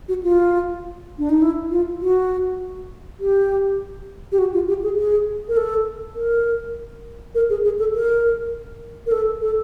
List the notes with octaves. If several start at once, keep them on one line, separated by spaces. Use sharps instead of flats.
F#4
F4
D4
D#4
E4
F4
F#4
G4
G4
F#4
F4
G4
G#4
G#4
A#4
A4
A#4
A#4
G#4
G#4
A4
A#4
A#4
A4
A4